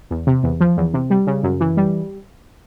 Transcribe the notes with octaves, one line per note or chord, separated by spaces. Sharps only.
E2
C3
E2
F3
E2
C3
G3
C#3
F#2
E3
G3